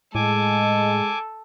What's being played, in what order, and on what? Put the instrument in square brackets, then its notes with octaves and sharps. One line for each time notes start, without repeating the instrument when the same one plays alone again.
[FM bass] A2 [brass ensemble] G#3 [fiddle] A4 [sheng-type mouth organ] G#5 D6